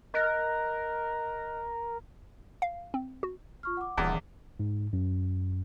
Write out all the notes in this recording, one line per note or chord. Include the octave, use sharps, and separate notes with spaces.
A#4 D#5 F#6 A#6
F5
C4
F#4
F4 C#6 F6
F#5 D6
D#1 E2
G#2
F#2